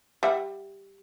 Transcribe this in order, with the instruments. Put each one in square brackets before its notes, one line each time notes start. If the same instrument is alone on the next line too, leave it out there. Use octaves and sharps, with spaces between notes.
[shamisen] G3 E5 F#5